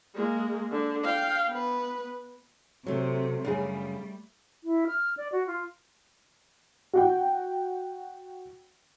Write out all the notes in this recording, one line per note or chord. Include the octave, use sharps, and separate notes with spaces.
G#3 A#3
D3
F5 G5
B3 B4
C3 F#3 A3
F#2 C#3 G3 A3 G#4
E4
F6
D5
F#4
F4
F#4 F#5 G5